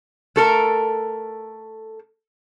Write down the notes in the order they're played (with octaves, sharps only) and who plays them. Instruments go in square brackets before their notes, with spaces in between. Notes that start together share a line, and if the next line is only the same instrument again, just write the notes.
[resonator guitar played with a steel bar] A3 A4 A#4